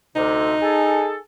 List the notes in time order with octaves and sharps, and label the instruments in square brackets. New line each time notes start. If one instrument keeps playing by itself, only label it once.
[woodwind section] D2 C3 [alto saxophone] D#4
[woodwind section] G#4 A4